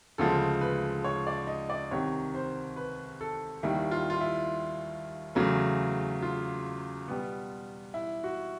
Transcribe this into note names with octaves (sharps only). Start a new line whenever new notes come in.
D2 C#3 F3 G#3 A4
B4
C#5
D5
D#5
D5
C2 C3 D#3 C#5
C5
B4
A4
D#2 D#3 G3 E4
F4
F4
E4
E2 C#3 F#3 A3
F4
B2 G3 B3
E4
F#4